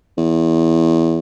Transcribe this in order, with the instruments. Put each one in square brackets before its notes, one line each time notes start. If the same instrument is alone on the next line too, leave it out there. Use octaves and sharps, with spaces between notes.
[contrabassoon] E2